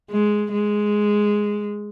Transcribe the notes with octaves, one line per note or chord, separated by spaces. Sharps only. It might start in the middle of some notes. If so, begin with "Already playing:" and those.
G#3
G#3